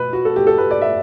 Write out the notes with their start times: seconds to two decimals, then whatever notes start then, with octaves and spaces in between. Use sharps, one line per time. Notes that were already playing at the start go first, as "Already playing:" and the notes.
Already playing: B2 B4
0.13 F#4
0.25 A4
0.36 G4
0.47 A4
0.58 B4
0.71 D5
0.81 E5